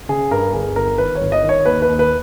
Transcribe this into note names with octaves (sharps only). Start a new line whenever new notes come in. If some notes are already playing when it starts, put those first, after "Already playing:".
C#3 G#4
G2 A#4
G1 G#4
G1 A#4
D#3 B4
C#5
G1
D#5
D#3
C#5
D#2 B4
B4
D#2
B4